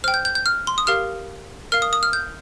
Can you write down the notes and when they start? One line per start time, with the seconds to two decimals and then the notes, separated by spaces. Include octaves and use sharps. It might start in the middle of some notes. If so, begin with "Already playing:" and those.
0.04 C5 F6
0.08 G5
0.14 G6
0.25 G6
0.35 G6
0.46 F6
0.67 C6
0.78 D#6
0.87 G4 A#4 F5 F6
1.72 A#4 F5 F6
1.82 D#6
1.93 D#6
2.03 F6
2.13 G6